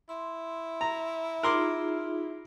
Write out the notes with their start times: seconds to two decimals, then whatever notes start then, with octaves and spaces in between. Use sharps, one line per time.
0.09 E4 C6
0.81 A#5
1.43 D#4 F4 G#4 A#4 C6 D6